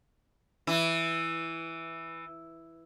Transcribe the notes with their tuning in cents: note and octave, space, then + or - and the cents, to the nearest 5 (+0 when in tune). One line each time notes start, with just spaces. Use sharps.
E3 +0 E4 +0